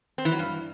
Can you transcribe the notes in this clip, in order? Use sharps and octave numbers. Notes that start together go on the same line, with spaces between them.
C4
E3
F#3
G2